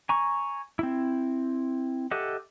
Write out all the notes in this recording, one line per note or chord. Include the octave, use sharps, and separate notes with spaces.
G#5 A#5 C#6
C4 E4
G4 A4 D#5 E5 F#5